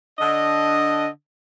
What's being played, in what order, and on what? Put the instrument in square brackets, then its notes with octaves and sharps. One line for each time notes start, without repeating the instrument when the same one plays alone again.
[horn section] D3 D4 D#5